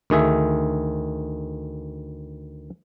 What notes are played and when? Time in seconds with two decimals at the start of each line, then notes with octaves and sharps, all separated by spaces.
0.10 D2 D#3 G#4 E5